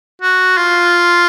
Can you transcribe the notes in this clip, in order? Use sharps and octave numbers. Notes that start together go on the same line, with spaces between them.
F#4
F4